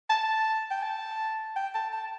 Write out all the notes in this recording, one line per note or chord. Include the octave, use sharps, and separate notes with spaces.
A5
G5
A5
G5
A5
A5